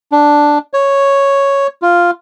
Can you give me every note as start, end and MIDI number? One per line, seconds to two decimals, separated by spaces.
0.12 0.58 62
0.74 1.67 73
1.82 2.11 65